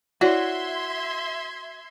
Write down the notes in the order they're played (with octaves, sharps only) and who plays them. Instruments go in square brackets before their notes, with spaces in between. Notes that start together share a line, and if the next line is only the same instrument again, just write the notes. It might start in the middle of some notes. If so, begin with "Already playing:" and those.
[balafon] E4 C#5 D5 [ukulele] F#4 [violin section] E5 C6 G#6